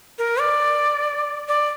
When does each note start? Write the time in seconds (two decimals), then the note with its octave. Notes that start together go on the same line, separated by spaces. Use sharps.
0.18 A#4
0.40 D5
1.48 D5